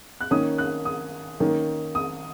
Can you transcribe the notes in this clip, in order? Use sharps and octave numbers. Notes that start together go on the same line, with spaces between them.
F#6
D#3 A#3 C#4 D#6
F#6
D#6
D#3 A#3 C#4
D#6